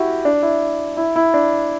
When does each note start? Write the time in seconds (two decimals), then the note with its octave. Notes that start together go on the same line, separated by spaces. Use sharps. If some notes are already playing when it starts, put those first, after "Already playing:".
Already playing: E4 F#4 G4
0.25 D4
0.43 E4
0.97 E4
1.16 E4
1.34 D4